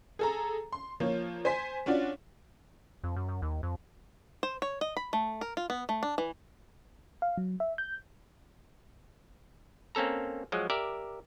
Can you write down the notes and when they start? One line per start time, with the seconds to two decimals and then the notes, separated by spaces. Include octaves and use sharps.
0.19 G#4 A4 A#5
0.72 C6
1.00 F3 A#3 F4 C#5
1.45 C5 G#5 C6 B6
1.86 C#4 D4 F4 F#4 D5
3.04 F2
3.16 F#2
3.29 F#2
3.42 D#2
3.63 F2
4.43 C5
4.62 C#5
4.81 D#5
4.97 B5
5.13 A3
5.41 A#4
5.57 F4
5.70 B3
5.89 A3
6.03 D4
6.18 E3
7.22 F5
7.37 F#3
7.60 E5
7.78 G6
9.95 A#3 C4 C#4 A4 A#5
10.52 F3 F#3 G#3
10.70 G4 A#4 D5 E5